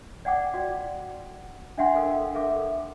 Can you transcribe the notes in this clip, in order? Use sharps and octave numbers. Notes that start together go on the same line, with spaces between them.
D5 F#5 G5 D6
F#4 D5 D#5
D4 D#5 E5 F#5 G5 C6
A4 A#4 F5
A4 A#4 E5 F5 D6